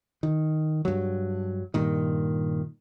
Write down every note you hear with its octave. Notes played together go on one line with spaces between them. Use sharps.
D#3
G2 F#3
G2 A#2 D#3